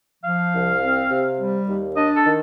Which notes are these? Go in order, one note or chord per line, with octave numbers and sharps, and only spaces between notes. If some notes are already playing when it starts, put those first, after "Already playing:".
F3 F5
C2
C4
C3
G3
D#2
D4 D#5
A4
D#3